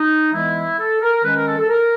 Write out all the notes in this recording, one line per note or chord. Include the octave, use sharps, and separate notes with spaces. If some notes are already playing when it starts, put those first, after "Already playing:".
Already playing: D#4
E3 G#3 B3 E4
A4
A#4
D#3 G#3 C#4 B4
A#4
A4
A4
A#4